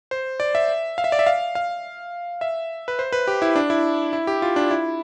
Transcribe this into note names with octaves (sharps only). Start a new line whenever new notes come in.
C5
D5
E5
F5
E5
D5
E5
F5
F5
E5
B4
C5
B4
G4
E4
D4
E4
E4
G4
F4
D4
E4